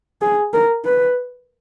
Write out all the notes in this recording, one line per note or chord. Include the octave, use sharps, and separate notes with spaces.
G#4
A#4
B4